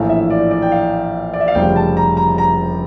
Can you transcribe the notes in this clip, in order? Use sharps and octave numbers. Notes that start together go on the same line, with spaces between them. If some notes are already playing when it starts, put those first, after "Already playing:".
Already playing: A#1 A2 E3 A3 F5
E5
D5
D5
G5
F5
D5
E5
F5
F1 F2 C#3 G3 G5
A5
A#5
A#5
A#5